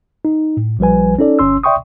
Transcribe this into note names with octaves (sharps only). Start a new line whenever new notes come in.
D#4
A2
A#1 F3 G3 B4 G#5
C#4 D#4 A4 D5
G1 C#4 C6 E6
D5 E5 G5 C6 C#6 D#6